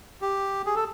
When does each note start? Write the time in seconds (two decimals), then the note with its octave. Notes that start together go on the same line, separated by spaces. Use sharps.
0.22 G4
0.66 G#4
0.76 A4